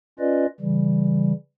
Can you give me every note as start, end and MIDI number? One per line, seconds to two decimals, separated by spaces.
0.19 0.46 61
0.19 0.46 65
0.19 0.46 71
0.19 0.46 74
0.19 0.46 75
0.60 1.32 49
0.60 1.32 52
0.60 1.32 55